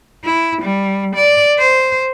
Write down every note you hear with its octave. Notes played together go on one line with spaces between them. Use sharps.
E4
G3
D5
C5